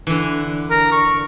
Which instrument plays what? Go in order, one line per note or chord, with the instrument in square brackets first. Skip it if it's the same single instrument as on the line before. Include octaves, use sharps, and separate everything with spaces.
[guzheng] D3 E3
[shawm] A#4
C#6